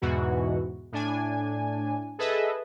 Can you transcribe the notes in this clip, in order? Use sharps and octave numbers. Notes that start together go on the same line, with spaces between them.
E2 G#2 B2 E3 F#4
A2 D4 G#5
G#4 A4 B4 D#5 E5